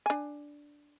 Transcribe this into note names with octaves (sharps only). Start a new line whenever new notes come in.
D4 G#5